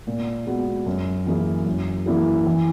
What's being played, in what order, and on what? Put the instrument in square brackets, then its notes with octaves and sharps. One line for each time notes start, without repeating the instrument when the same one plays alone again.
[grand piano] A#2
G#3 B3 F#4
F#2
E3 A#3 E4 G#4
F#2
E3 A#3 E4 G#4
E3